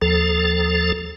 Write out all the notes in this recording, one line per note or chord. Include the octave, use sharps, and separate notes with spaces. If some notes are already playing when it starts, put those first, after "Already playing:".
D#2 F3 A4